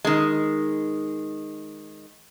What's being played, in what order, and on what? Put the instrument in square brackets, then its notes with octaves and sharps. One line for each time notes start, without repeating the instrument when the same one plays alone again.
[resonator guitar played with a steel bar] D#3 G#3